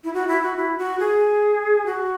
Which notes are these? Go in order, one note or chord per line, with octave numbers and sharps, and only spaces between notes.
E4
F#4
E4
F#4
E4
F#4
G#4
F#4